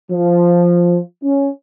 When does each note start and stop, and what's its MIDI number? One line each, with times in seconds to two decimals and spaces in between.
0.11 0.98 53
1.23 1.48 61